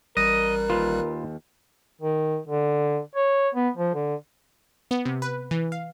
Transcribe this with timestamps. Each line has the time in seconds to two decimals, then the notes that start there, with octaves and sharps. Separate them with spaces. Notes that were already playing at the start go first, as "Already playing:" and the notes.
0.17 A1 G3 A#4 D#5 F#6
0.70 D#2 F4 B4
2.01 D#3
2.48 D3
3.15 C#5
3.55 B3
3.77 F3
3.95 D3
4.91 B3
5.05 C3
5.22 B4
5.51 E3
5.72 F5